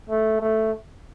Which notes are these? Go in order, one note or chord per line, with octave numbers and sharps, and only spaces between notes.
A3
A3